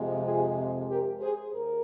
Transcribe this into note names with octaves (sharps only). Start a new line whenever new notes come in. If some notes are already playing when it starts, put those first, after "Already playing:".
Already playing: F2 C3 F3 G#3
F4 G#4
G4 A#4
G#4 C5
D#2 A#4